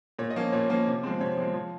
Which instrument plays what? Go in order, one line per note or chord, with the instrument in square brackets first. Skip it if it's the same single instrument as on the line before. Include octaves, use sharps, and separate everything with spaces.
[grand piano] A#2 C#5
D#5
F3 A#3 C#4
A#2 C#5
F3 A#3 C#4
C3
F3 G#3 C4
C3 C#5
F3 G#3 C4
F3